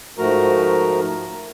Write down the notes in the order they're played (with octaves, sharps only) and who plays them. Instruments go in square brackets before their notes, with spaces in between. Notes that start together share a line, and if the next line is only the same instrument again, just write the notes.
[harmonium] G#2 F3 A3 F#4 A#4 A#5